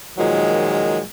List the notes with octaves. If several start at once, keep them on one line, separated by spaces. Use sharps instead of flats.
A#2 D#3 F3 F#3 G#3